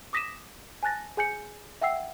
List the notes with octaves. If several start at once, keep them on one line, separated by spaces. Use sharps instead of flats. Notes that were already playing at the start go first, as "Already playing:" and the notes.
D6 D#6 A#6 B6 D#7 E7
G#5 A5 F#6 A6 A#6
G#4 G#5 G6 C#7
E5 F#5 G5 E6 C7